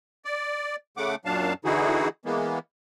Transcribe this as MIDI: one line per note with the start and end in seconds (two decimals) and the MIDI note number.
0.25 0.76 74
0.97 1.15 49
0.97 1.15 57
0.97 1.15 78
0.97 1.15 86
1.25 1.53 42
1.25 1.53 46
1.25 1.53 54
1.25 1.53 62
1.25 1.53 77
1.25 1.53 81
1.65 2.08 50
1.65 2.08 52
1.65 2.08 63
1.65 2.08 64
1.65 2.08 66
1.65 2.08 68
2.25 2.59 52
2.25 2.59 56
2.25 2.59 58
2.25 2.59 59